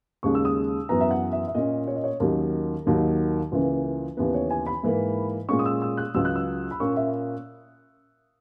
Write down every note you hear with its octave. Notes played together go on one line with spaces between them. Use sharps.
D#2 C#3 G#3 C#4 C#6
E6
D#6
F#2 E3 B3 A#5
E5
F#5
E5
E5
A#2 A#3 C#4 D#5
C#5
D#5
C#5
D#2 D#3 F#3 C#4 A#4
D#2 D#3 F#3 A#3
C#2 C#3 E3 A#3
D#2 C#3 E3 B3 B4
C#5
G#5
B5
G#2 E3 A#3
A#2 G#3 C#4 C#6
D#6
E6
E6
F#6
C#2 C#3 F#3 E6
F#6
E6
B5
A#2 A#3 C#4 C#6
E5